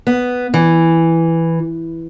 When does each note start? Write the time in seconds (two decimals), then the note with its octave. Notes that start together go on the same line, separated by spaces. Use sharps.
0.07 B3
0.54 E3